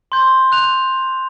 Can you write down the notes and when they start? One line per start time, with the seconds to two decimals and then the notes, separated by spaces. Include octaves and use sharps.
0.12 C6 G6
0.52 F#6 F7